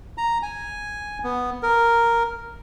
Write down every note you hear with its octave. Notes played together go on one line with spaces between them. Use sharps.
A#5
G#5
B3
A#4